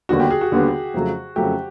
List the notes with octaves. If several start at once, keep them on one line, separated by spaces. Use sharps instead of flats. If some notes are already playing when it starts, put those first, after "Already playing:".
D#2 D3 G3 B3 D4 F#4
G4
G#4
F#4
D#2 D3 G3 B3 D4
F2 C#3 F#3 A3
F2 C#3 F#3 A3 G4